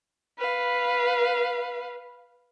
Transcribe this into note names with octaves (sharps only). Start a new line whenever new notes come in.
B4 F5